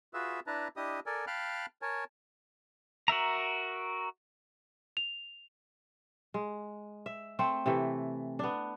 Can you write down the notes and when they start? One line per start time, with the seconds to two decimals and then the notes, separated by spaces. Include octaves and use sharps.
0.14 F4 F#4 G#4 B4 E5 E6
0.47 D4 E4 B4 A5 A#5
0.76 D4 E4 G4 D#5 D#6
1.06 A4 A#4 D5 G#5
1.27 F5 G5 A5 B5 F6 F#6
1.82 A#4 C#5 G#5 A5
3.08 F#4 A#4 E5 A#5
4.97 F7
6.34 G#3
7.06 E5
7.39 A3 C4 C5
7.66 C3 E3 A3
8.39 B3 D4